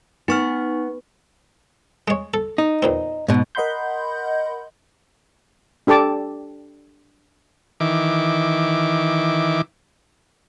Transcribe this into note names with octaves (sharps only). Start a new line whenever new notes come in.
B3 D#4 C#6 F6
G#3 C#5
A4
D#4
E2 A#2 C4
G#2 B2
A#4 D#5 F#5 B5 C6 G6
D4 G4 A4 A5 D6
D#3 E3 D6